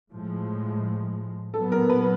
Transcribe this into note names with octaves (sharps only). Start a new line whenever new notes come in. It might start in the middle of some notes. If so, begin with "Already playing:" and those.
A2 F3 G#3
A#2 F#3 B3 A4
A#4
B4